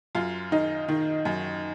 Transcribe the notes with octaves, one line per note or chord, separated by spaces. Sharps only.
F#2 F4
D#3 D#4
D#3
F#2